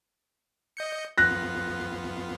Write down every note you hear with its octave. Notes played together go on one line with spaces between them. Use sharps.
D#5 G6 C#7
F2 B3 F4 F#6 A#6